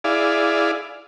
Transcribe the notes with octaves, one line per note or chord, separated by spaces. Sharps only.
E4 G#4 D5 F5